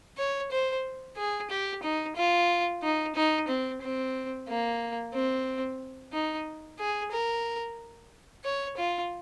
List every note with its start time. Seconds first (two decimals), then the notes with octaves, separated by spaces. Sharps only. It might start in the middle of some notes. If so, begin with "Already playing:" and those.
0.18 C#5
0.51 C5
1.17 G#4
1.50 G4
1.83 D#4
2.16 F4
2.83 D#4
3.15 D#4
3.48 C4
3.81 C4
4.48 A#3
5.13 C4
6.13 D#4
6.79 G#4
7.12 A#4
8.44 C#5
8.77 F4